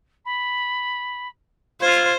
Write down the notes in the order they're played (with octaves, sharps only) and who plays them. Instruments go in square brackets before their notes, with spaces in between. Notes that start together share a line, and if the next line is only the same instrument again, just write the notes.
[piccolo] B5
[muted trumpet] F4 [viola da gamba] C5 [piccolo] G#6